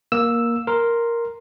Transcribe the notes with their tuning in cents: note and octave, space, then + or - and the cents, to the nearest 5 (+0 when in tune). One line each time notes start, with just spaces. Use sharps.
A#3 +10 E6 +0
A#4 +0 C6 +0